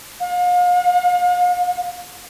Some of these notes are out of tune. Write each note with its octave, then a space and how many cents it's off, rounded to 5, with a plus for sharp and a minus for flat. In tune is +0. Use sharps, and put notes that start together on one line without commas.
F5 +40